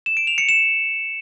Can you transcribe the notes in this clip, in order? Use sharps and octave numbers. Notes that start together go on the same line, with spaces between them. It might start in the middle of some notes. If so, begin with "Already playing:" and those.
E7
D7
F7
C#7
E7